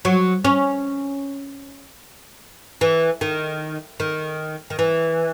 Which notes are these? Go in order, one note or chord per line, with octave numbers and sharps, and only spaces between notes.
F#3
C#4
E3
D#3
D#3
D#3
E3